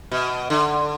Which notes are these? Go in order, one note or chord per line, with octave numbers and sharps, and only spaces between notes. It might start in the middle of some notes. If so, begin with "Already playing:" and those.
B2
D3